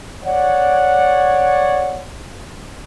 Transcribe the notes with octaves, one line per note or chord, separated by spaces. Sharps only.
C#5 D5 F#5